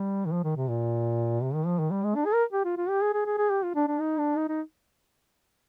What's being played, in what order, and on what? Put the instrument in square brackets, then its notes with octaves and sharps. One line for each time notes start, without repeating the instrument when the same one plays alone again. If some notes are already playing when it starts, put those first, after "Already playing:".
Already playing: [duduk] G3
D#3
F3
D#3
C3
A#2
C3
D#3
F3
D#3
G3
G#3
D4
G#4
A#4
G4
F4
F4
G4
G#4
G#4
G#4
G#4
G4
F4
D4
D4
D#4
D4
D#4
D#4